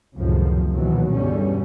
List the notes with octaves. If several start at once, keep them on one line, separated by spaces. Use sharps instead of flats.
C#2 F#2 A2 C3 D#3 F3
A#1 D#2 B2 D#3 E3 F#3
E2 G2 B2 D3 G3 C#4